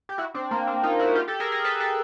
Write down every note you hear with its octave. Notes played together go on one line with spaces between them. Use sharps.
G4
E4 F#4
C4 D4
A#3 C4
C4 D4
D#4 F4
E4 F#4
F4 G4
G4 A4
G#4 A#4
G#4 A#4
A4 B4
A4 B4